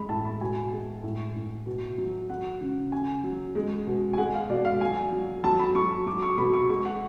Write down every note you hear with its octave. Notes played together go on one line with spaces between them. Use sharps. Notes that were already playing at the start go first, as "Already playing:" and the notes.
Already playing: G#3 B5
A2 A5
B5
B2 G#5
G#3
A2
A2
B2
F#3
F#3 F#5
C#3
C#3 G#5
F#3
G#3
B2
G#5
G#3 F#5
F5
B2 D5
F5
F#3 G#5
F#3
F#3 A5
B5
F#3 C#6
F#3 D6
C#6
B2 B5
C#6
G#3 C#6
F#5